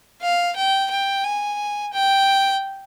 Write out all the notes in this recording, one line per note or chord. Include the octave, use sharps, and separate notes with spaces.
F5
G5
G5
G#5
G5